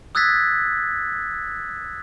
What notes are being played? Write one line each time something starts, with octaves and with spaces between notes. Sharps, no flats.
D#6 E6 F#6 G#6 A6 B6